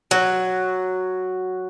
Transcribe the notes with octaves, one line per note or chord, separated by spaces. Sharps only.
F#3